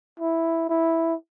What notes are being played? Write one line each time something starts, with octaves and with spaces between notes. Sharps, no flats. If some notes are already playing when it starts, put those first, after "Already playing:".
E4
E4